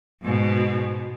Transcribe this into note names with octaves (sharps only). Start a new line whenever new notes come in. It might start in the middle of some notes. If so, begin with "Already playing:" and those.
G#2 B2